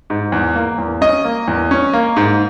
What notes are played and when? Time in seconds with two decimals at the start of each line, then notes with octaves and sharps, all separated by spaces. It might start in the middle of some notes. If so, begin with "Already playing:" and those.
0.10 G#2
0.32 E2
0.56 A#3
0.78 E2
1.01 C#4 D#5
1.25 A#3
1.48 E2
1.71 C#4
1.93 A#3
2.16 G#2